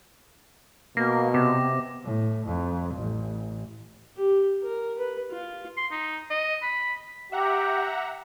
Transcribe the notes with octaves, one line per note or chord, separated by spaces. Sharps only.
B2 A#3 A#6
C3 B3 D6
A2
F2
A1
G4
A#4
B4
F4
C6
D#4
D#5
B5
G4 E5 F#5 A#5